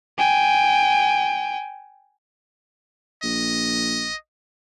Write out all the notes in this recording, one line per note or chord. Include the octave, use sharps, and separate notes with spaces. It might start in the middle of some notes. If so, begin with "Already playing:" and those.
G5 G#5
A#1 D#5